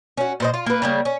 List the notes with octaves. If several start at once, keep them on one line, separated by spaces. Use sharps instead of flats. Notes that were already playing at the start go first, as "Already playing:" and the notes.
C#4 F#4
A#2 C5 D#5
F4
A#3 B4
C#3 G3 A#3
C#4